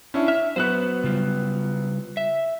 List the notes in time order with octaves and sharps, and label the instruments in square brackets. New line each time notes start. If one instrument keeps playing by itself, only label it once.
[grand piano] C#4 D4 E4
[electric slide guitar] E5 [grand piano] F6
[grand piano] F#3 B3 F#6 [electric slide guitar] F#4 B4 C5
[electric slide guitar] C#3 G3 F4
E5